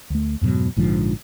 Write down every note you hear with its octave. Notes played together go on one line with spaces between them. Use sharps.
D2 A3
F2 G#2 B2 F#3
A#1 G#2 D3 F3